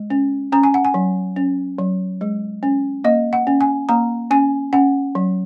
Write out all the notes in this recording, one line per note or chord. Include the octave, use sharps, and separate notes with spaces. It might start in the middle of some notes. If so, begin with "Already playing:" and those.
Already playing: G#3
C#4
C#4 A#5
G#5
F#5
G#5
F#3
C#4
F#3
G#3
C#4
A#3 D#5
F#5
C#4
G#5
A#3 A#5
C#4 G#5
C#4 F#5
F#3